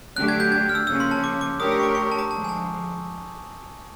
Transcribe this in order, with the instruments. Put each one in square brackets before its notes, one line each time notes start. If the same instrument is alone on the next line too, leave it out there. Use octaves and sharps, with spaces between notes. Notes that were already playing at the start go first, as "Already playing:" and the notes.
[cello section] D3 F#3 A3 D4 G4 [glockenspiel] F#6
[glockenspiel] G#6
G6
G#6
F6
E6
[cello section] C#3 F3 A#3 C#4 [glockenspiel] E6
[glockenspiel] C6
A5
D6
D6
[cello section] A3 D4 G4 A#4 C#5 [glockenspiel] D#6
[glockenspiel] E6
C#6
D6
C#6
A5
A#5
[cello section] D3 F3 G#3 [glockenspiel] A5
[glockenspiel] G#5
A5